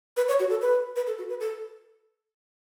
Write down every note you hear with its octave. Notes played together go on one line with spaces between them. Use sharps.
B4
C#5
F#4
A4
B4
B4
A4
F#4
B4
A4